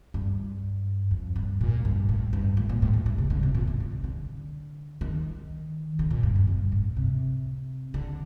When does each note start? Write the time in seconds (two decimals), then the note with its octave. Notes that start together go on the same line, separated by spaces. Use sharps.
0.14 G2
1.11 F2
1.36 G2
1.61 A#2
1.85 G2
2.09 A2
2.33 G2
2.57 A2
2.69 A#2
2.82 A2
2.94 A2
3.06 G2
3.18 C3
3.30 D3
3.43 C3
3.55 A#2
3.67 A2
3.80 A2
3.92 C3
4.04 D3
5.01 D#3
5.99 D3
6.10 A#2
6.23 G2
6.36 F2
6.47 G2
6.72 A2
6.97 C3
7.94 D3